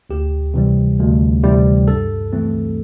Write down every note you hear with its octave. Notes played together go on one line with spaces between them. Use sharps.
D2 G4
C3 E3 G3
D2
C3 E3 G3
G2 A4
E3 A3 C4